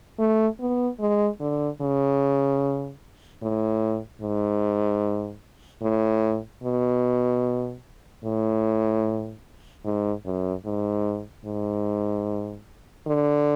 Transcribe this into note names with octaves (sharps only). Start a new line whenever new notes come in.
A3
B3
G#3
D3
C#3
A2
G#2
A2
B2
A2
G#2
F#2
G#2
G#2
D3